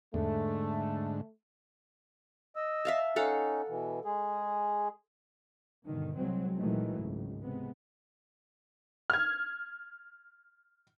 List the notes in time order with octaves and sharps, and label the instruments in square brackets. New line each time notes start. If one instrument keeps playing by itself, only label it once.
[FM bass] E2 [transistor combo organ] G#2 D3 [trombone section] A3
[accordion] D#5 E6
[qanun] E5 F5 A5
[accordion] C#4 D#4 [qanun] A4 F5 F#5
[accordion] B2 E3
G#3 G#4
[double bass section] G2 B2 D3 D#3
C2 F#3 G#3 C4
A#2 D#3 E3 F#3 G#3 A3
G#1 C#2
C3 G#3 B3
[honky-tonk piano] F6 G#6